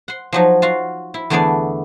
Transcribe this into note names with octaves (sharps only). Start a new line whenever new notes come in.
F#5 C6
F3 F#3 D#4
F4 F#4 F5
E4
E2 D3 A3 B3 G#4 D5